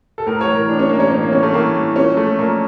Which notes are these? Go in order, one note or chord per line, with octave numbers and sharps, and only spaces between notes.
A4
A2 A#4
C#5
E3
A#4
A2 D4
C#4
E3 A#3
C#4
A2 C#4
A#3
E3 C#4
A3
A2 A#3
E3
A#2 C#4
F3 A3
A#2 A#3